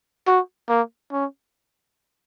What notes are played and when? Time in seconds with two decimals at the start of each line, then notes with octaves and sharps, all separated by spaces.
0.27 F#4
0.69 A#3
1.12 C#4